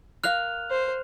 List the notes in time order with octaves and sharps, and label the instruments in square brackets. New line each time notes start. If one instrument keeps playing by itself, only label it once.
[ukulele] A#4 F5 [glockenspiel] F6 F#6 F7
[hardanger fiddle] C5